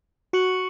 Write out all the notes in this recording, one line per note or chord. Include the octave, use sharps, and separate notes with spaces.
F#4 C#6 F#6 C#7 F#7